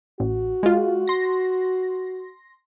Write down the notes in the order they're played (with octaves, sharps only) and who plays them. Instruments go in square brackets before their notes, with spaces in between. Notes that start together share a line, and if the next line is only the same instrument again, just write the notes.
[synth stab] A1 [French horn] F#4
[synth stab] G#3 F4
C6 A#6